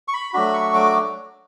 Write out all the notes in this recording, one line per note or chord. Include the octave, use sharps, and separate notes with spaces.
C#6
B5
F#3 A3 D4 F#4 B5
C#6
D6